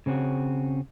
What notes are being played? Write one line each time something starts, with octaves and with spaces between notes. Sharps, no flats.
C#3 C4 C#4 F#4